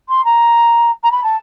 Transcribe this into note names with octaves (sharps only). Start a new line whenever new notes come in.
C6
A#5
A#5
B5
A5